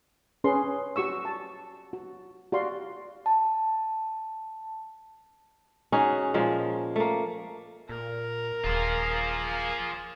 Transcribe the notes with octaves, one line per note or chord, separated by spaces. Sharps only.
C#4 G#4 B4 C6
F#4 G4 C#6 E6
A5
F#4
F#4 G4 D5 F5 C6
A5
C#4 D#4 F#4 G#4
A#2 F3 G#3
A3 A#3
A#2 A#4
D#1 A#3 F4 G#4 C5